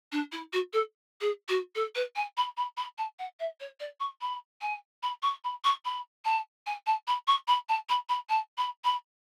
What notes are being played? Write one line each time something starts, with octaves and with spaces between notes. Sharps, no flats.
D4
E4
F#4
A4
G#4
F#4
A4
B4
G#5
B5
B5
B5
A5
F#5
E5
C#5
D5
C#6
B5
G#5
B5
C#6
B5
C#6
B5
A5
G#5
A5
B5
C#6
B5
A5
B5
B5
A5
B5
B5